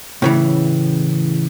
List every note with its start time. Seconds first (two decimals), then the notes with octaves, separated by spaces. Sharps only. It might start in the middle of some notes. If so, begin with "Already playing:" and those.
0.22 A2 C#3 E3